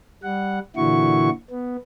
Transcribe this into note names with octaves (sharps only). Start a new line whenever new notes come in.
G3 F#5
A#2 D3 E3 E4 F#4 C#6
B3